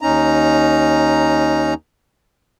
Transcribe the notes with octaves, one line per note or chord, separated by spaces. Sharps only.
D#2 C#4 D#4 A#5